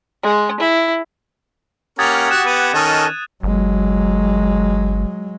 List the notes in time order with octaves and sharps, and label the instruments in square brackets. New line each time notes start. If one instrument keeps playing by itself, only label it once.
[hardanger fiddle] G#3
E4
[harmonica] A#3 C#4 A#4 [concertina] G4 F#5 [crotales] D#6 G#6 A6
[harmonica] F#4 [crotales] F#6 E7
[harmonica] B3 [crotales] D#6 D#7
[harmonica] D#3 C#4 [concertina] A4 D#5
[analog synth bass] G1 [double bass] F#3 G#3